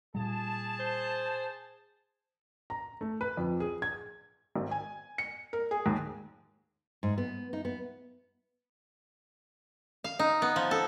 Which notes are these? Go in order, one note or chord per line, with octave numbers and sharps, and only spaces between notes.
A#2 G3 G#4 A5
C5
A#5
A3
B4
F2
G#4
G#6
G#1
G#5
C#7
A#4
G#4
D#2
G#2
B3
D#4
B3
F5
D#4
B3
F3
A4